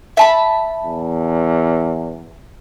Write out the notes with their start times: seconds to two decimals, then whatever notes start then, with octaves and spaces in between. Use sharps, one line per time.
0.17 E5 A5 B5
0.84 E2